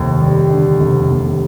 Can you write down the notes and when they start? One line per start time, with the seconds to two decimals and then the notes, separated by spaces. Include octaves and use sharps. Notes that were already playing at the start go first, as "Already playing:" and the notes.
Already playing: F1 D#2
0.21 G3
0.50 D3
0.80 F1
1.11 D#2